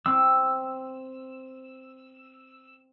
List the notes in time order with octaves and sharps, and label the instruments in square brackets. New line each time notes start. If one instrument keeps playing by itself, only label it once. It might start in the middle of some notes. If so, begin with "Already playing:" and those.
[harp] C4 [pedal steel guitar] E6